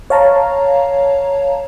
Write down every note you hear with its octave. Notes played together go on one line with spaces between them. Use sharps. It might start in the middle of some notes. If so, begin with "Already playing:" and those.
C#5 F5 A5 A#5